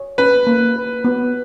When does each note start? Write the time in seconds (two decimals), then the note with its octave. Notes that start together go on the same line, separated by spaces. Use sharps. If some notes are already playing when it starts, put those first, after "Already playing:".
Already playing: C#5
0.18 C#4 B4
0.47 A#3
0.76 B4
1.04 B3